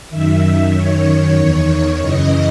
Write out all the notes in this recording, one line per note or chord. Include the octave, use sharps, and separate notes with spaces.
F#2 D#3 E5
F#2 D#3 C#5
C#5
E2 D#3
F#2 C#3 E3 D#5